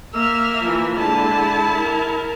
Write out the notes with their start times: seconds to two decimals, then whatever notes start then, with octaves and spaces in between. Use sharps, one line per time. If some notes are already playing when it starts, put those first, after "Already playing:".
0.14 A#3 E5 E6 F6
0.62 E3 F3
0.97 D3 G#3 E4 A5
1.74 A#4